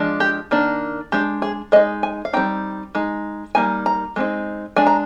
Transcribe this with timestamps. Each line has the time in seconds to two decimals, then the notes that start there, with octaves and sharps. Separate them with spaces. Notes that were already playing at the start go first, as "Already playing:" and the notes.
Already playing: F3 G#3 D4
0.20 G4
0.51 D#3 A#3 D4
1.12 G#3 D4 G4
1.42 G#4
1.72 G#3 D#4 D#5
2.03 G#5
2.25 F5
2.33 G3 C4 D#4 G5
2.95 G#3 D#4
3.55 G3 A#3 D#4 G#5
3.86 A#5
4.16 G#3 C4 D#4
4.76 G#3 D4 G#5
4.87 A#5